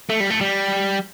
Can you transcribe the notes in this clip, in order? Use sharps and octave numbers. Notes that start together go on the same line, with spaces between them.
A3
G3
A3
G3